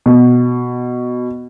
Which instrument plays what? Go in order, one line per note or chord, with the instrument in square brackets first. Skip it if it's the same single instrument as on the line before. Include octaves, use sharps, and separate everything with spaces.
[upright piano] B2